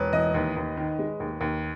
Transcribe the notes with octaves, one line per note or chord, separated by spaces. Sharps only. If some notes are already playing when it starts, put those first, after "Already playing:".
Already playing: E1 B4 C#5
E3 D#5
D#2
D#2
D#3
G#3
D#2
D#2